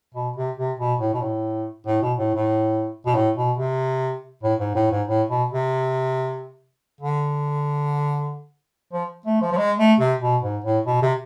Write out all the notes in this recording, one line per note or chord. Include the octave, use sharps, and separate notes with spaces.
B2
C3
C3
B2
A2
B2
A2
A2
B2
A2
A2
B2
A2
B2
C3
A2
G#2
A2
G#2
A2
B2
C3
D3
F3
A3
F3
F3
G#3
A3
C3
B2
G#2
A2
B2
C3